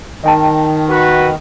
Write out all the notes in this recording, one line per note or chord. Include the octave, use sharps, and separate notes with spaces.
D#3 D#5 G5 A5
F#4 B4